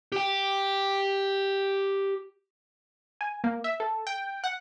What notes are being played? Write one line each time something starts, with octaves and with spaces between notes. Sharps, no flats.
G4 G5
G#5
A#3
E5
A4
G5
F#5